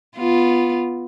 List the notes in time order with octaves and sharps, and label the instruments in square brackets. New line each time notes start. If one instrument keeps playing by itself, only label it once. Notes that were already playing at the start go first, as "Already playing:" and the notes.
[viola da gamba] B3 F4